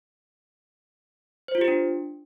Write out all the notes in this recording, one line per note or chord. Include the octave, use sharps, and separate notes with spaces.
C5
F4
G4
D4